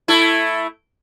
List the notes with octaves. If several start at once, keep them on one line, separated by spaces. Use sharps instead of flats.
A3 E4